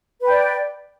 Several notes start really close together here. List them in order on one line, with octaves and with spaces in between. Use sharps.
B4 G5 D5